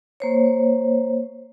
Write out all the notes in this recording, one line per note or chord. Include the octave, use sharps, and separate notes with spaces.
A#3 C5 C#5